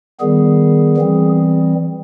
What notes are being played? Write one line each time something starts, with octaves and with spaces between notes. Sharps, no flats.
D#3 G3 B3 G#4
E3 G3 C4